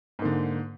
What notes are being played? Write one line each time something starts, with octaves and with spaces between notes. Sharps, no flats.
G#2 D3 A#3